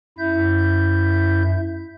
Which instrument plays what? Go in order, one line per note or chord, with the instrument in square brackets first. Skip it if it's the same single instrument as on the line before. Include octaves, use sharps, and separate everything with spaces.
[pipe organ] F#2 E4 E5 G6